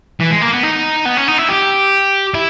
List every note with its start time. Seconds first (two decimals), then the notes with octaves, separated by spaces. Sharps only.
0.20 E3
0.31 G#3
0.41 A#3
0.52 B3
0.63 D#4
1.05 B3
1.17 C#4
1.28 D#4
1.38 E4
1.49 G4
2.34 E4